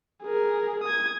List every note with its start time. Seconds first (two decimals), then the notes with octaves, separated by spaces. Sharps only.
0.23 G#4 A#4
0.84 D#6 G#6